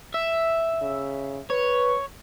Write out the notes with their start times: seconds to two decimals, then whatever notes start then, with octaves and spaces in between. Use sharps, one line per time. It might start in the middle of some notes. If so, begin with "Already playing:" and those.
0.14 E5
0.81 C#3
1.50 B4 C#5